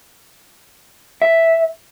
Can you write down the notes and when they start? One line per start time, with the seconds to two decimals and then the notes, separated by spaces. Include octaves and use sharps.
1.22 E5